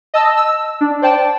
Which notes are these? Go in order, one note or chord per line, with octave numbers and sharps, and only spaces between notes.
D#5 A5 E6
E6
D4
C5 D5 G5 A5